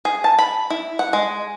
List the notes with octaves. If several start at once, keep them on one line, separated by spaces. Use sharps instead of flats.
G#4
A5
B5
E4
F#5
G#3